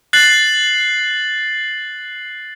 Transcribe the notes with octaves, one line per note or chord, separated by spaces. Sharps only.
F#6 A6 C7 F#7